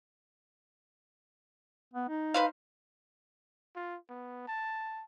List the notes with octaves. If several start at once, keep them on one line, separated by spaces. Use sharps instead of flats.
B3
D#4
B4 C5 F5
F4
B3
A5